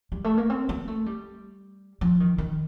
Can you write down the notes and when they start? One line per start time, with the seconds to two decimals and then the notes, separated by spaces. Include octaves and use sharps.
0.12 G3
0.24 A3
0.38 A#3
0.50 C4
0.69 A#3
0.88 A3
1.06 G3
2.01 F3
2.20 D#3
2.38 D#3